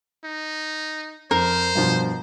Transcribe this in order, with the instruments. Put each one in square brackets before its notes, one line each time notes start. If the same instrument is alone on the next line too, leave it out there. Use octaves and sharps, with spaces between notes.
[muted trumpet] D#4
[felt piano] F2 [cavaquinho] A#4 [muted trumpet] C5
[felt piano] G2 B2 F3